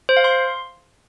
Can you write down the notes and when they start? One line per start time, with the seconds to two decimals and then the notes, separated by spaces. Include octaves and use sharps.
0.09 C5
0.17 F5
0.24 C6